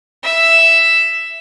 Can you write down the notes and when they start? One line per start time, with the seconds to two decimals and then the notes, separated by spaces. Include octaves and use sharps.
0.23 E5